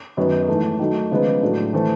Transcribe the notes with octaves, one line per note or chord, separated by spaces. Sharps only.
F#2 D#3 F#3 B3 D#4
G#2 E3 A3
D#3 F#3 A3
C#3 F3 G#3 B3 D#4
A2 F#3 A3 D4
E3 A3 C4